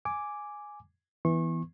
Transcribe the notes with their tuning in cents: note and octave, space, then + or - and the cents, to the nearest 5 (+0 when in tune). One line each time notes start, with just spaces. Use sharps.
G#5 +0 D6 +0
E3 -5 B3 +0 C#6 -35